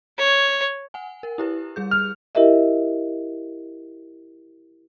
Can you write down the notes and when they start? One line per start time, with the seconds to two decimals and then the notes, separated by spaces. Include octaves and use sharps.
0.18 C#5
0.94 F#5 G#5
1.23 A#4
1.38 E4 G4 B4
1.76 G3 G#4 G6
1.91 F6
2.35 E4 G4 A#4 D#5 E5